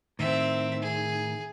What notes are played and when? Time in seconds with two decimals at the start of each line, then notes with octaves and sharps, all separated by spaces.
0.19 A2 D#3 C4 E5
0.82 G#4